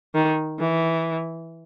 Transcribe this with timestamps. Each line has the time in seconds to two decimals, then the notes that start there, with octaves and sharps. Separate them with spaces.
0.14 D#3
0.60 E3